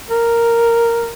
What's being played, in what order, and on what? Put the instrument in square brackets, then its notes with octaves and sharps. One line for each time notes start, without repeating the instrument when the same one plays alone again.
[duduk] A#4